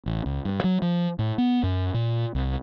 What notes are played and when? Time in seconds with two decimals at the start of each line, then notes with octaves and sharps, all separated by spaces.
0.06 A1
0.26 C#2
0.45 G2
0.64 F#3
0.82 F3
1.19 A2
1.38 B3
1.63 F#2
1.94 A#2
2.35 C2